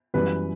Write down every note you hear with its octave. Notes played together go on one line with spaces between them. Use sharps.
F#2 E3 G3 B4